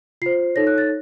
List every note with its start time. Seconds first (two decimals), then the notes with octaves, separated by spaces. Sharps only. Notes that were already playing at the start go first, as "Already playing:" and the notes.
0.22 F4 C5 C7
0.56 D#4 A4 C#5 A#6
0.67 F#6
0.78 A6